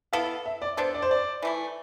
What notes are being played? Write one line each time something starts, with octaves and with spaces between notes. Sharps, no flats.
B3 E4 A4 F5
E5
D5
B3 D4 A4 C5
D5
C5
D5
E3 A3 E4